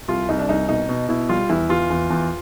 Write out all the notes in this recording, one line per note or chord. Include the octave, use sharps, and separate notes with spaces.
C2 F4
C2 D#4
D4
C2 D#4
B2 D#4
B2
B2 E4
G3 F4
E2 E4
E2 F4
E2
E2